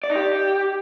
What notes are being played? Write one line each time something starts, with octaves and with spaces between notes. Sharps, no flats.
D5
D#4
G4